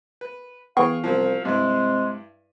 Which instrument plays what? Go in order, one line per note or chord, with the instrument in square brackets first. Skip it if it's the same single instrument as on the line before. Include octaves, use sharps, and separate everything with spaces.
[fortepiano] B4
[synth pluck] E3 B3 [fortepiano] G#4 G5 C#6 [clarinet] F5
[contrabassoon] C2 [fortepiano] F3 F#3
[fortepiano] G2 E4 [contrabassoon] C3 [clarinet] G#3